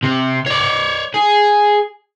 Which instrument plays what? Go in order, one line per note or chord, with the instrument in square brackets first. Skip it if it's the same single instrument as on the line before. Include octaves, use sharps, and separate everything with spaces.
[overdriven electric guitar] C3
C#5 D5
G#4